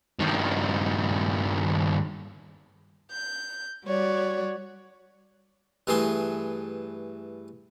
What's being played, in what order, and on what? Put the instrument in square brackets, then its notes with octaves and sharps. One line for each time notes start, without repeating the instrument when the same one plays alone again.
[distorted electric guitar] G2 D#3
[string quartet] G6
G3 F#4 C#5 D5
[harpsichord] G2 E3 A3 G#4 C6